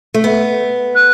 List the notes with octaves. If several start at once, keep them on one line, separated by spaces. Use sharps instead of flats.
A3
B3
F#6